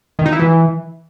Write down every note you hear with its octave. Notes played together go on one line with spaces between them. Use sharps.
D#3
D#4
E4
E3